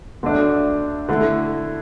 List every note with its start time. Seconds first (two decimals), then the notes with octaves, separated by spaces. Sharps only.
0.23 D2 D3 A3 D4
1.09 D3 A3 E4